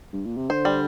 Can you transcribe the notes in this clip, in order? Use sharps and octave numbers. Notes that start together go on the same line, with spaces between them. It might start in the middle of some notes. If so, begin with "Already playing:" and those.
G2
A#2
C3
D3 C5
G3